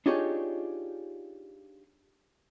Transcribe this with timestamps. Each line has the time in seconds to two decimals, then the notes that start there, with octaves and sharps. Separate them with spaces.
0.06 D4 D#4 F4 G4 G#4 C#5